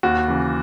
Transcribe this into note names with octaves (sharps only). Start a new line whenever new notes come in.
D#2 F#4
C#3 E3